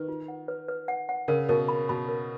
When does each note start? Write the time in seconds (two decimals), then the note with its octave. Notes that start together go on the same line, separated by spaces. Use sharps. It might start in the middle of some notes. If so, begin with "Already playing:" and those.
Already playing: D#3 B4
0.09 F4
0.28 F#5
0.48 B4
0.68 B4
0.88 F#5
1.09 F#5
1.28 C#3 A#4
1.49 B2 A#4
1.68 B5
1.89 B2 B5
2.08 A#4